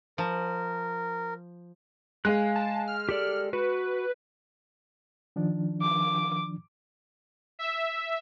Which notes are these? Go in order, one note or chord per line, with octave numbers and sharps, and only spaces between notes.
F3 A#4
G#3 F5 G#5 F#6
A5
F6
G4 A4 D5
F#4 B4
D#3 F3 D4
D6
E5